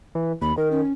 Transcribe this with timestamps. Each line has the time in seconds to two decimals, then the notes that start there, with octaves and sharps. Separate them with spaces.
0.15 E3
0.42 D#2 B5
0.58 D#3 A#4
0.71 C#4